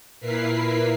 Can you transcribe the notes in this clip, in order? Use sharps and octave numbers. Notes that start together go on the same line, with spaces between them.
A#2 E4 A#4 B4 B6 C7